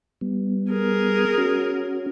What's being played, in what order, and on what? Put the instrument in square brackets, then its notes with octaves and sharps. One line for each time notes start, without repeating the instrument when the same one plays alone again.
[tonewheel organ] G3 B3
[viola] G#4 A#4
[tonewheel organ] C#4 F#4